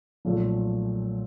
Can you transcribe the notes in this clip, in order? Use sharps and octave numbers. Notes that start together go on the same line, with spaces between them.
B1 A#2 F3 A3